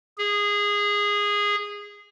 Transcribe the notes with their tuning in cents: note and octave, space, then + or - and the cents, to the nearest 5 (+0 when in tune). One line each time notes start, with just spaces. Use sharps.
G#4 -15